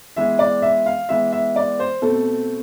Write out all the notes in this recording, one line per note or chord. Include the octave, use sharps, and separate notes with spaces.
E3 G#3 B3 E5
D5
E5
F5
E3 G#3 B3 E5
E5
D5
C5
B2 A3 C4 A4